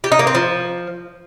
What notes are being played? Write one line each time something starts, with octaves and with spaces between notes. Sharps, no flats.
G4
D#4
A#3
C4
F3